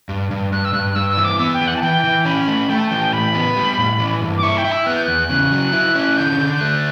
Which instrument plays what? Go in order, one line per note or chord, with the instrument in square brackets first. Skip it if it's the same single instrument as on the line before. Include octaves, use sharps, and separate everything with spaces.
[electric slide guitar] G2
G2
[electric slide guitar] G2 [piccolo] F#6
[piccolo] E6
[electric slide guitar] G2 [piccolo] F#6
[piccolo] F#6
[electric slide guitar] G2 [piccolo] E6
[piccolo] E6
[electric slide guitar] E3
[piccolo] D6
[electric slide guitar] B3 [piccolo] E6
[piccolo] G5
[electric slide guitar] E3
[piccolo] F#5
A5
[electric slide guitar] E3 [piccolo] G5
[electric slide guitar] E3
[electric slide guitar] C#4 [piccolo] B5
[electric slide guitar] A3
[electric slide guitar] A3 [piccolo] G5
[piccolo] A5
[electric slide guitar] E3 [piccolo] G5
[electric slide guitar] A2 [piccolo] B5
[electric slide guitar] B3
G3
A2
E3
G2
[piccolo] D6
[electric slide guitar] E4 [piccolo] C#6
[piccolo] G5
[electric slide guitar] E4
[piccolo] E6
[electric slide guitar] B3 [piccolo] F#6
[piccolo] G6
[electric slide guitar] E2 [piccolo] F#6
[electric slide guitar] C#3
F#3
E4
C#4
[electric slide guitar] D3 [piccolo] G6
[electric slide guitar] D3
[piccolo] G6
[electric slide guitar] A3 [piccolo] F#6